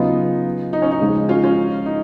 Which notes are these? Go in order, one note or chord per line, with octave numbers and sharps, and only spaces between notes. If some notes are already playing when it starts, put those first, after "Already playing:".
Already playing: C#3 F#3 B3 D#4 F4
D#4
C#4
D#4
C#3 F3 G#3
C#4 F4
C#4 F4
D#4